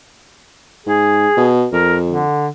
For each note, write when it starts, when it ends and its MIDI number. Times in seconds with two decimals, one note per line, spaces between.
0.86 1.27 44
0.86 1.52 68
1.37 1.67 47
1.72 2.23 41
1.72 1.96 70
2.08 2.48 50